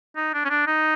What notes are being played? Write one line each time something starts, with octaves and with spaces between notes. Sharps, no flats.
D#4
D4
C#4
D4
D#4